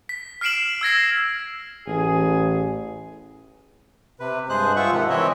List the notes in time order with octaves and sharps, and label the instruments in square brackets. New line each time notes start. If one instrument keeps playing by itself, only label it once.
[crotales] B6
F6 B6 C7 D7 E7 F#7
E6 G#6 A#6 C7
[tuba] A1 [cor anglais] G#4
[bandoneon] C3 B4
G2 G#3 G#4 C5 F#6
F4 E5 F#5 C#6
C3 D#3 F3 G#3
E3 C4 E4 C#5 D#5 E5